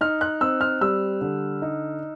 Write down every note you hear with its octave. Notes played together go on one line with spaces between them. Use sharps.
D#4 F6
F#6
C4 E6
F6
G3 E6
D3
D#4